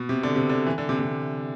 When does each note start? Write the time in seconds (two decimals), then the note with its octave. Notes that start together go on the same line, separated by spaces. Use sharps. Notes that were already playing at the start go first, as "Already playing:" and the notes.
Already playing: B2
0.09 C3
0.23 D3
0.36 C3
0.50 D3
0.66 E3
0.78 D3
0.89 C3
0.99 C3